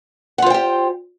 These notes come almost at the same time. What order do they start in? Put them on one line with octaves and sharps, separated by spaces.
F#5 F4 C5 G5 G4